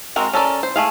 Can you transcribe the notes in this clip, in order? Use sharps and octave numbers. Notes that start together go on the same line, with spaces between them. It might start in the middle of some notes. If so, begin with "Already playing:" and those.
G#3 C4 F#4 A#4
C#4 A4 A#4 D5
C5
A3 G#4 F5